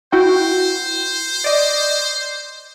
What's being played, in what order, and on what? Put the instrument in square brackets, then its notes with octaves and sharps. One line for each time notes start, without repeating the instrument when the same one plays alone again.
[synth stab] E4 F#4 G5 [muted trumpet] C5
[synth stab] D5 D#5